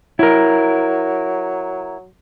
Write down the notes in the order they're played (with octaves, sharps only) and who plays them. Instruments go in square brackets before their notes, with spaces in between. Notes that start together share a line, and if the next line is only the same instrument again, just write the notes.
[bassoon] F#3 [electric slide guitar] E4 A#4